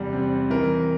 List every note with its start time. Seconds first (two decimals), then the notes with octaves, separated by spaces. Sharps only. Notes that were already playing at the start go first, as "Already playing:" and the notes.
Already playing: E2 C3 G3
0.13 C4
0.50 E3 A#4